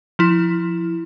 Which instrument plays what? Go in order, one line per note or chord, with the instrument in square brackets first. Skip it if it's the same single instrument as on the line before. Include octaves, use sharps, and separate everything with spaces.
[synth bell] F3 E4